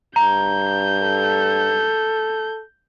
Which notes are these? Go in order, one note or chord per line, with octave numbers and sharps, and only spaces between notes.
G2 A#5 G6
A4